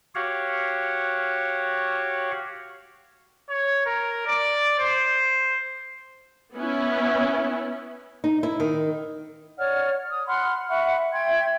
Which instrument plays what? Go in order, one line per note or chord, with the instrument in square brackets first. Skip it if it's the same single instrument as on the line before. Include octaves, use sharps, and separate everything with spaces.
[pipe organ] F#4 G4 C#5 F5 F#5
[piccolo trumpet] C#5
A#4
D5
C5
[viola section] B3 C#4 E4
[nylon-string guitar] D#4
E4
D#3
[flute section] C#5 D5 F#5 F6
D#6
F#5 B5 C6 F6
E5 F#5 B5 C#6
E5 G5 C6 G#6